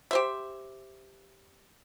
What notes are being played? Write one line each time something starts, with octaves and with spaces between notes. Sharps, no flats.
G4 C5 E5